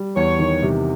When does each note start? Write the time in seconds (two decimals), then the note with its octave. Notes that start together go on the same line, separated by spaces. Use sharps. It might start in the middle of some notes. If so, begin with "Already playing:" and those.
Already playing: G3
0.16 E2 C#5
0.39 D#3
0.63 C3